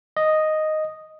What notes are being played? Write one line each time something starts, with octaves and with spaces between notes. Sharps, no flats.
D#5